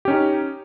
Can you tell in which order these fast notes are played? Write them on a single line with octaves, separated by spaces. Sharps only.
G4 C#4 D#4